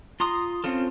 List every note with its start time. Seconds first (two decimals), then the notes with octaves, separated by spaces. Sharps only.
0.20 F4 A#5 C6 D#6
0.64 C4 C#4 F4 A4